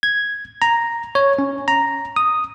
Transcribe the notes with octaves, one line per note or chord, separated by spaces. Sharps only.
G#6
A#5
C#5
C#4
A#5
D#6